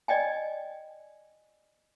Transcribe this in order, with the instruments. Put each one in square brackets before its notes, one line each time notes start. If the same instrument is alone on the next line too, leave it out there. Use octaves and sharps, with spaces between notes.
[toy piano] D5 D#5 G5 G#5